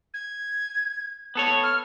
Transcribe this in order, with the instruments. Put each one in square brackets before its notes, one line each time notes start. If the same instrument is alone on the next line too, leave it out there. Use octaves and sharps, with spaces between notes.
[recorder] G#6
[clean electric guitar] B3 A4 C#5
[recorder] F6